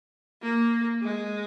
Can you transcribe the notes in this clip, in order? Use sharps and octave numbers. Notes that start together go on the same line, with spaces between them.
A#3
G#3